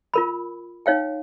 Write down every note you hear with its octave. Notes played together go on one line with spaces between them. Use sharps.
F4 A#4 B5
D#4 C#5 F5 G5